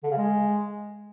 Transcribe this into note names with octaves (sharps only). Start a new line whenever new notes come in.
D3
C#3
G#3